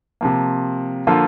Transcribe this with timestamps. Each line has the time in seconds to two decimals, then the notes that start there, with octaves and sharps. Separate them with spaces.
0.21 C3 F3 A#3
1.07 D3 F3 A#3 F4 A4